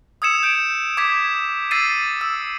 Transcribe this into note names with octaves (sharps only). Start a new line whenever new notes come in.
D#6 E6 G#6 C#7 E7
G6 D7
D6 G#6 B6
E6 A6 C7 D#7
E6